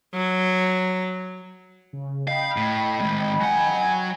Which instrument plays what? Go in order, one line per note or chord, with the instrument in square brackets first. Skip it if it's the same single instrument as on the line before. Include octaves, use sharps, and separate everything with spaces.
[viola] F#3
[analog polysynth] C#3
[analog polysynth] D#5 G5 B5 [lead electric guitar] F5
[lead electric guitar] A2
D#3 G#3
[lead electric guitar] F#3 F#5 [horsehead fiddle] G#5